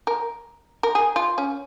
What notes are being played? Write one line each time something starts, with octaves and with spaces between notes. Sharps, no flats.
A#4
A#4
G#4
F4
C#4